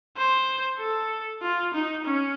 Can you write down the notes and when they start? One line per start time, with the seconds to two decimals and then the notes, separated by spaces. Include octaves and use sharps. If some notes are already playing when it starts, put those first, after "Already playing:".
0.17 C5
0.79 A4
1.42 F4
1.74 D#4
2.05 C#4